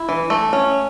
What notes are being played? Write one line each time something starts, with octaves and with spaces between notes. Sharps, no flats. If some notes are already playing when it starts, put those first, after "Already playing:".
Already playing: E4
E3
A3
C#4